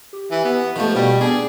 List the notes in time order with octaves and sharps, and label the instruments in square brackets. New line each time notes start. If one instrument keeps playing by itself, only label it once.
[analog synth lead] G4
[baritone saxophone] E3
B3
[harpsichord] D#3 A3 [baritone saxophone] F3
[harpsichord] B2 [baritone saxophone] G3 [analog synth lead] B4
[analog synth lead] B3 [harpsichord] D4 [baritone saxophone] G#4